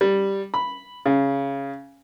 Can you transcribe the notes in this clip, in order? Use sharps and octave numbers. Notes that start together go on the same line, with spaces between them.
G3
B5
C#3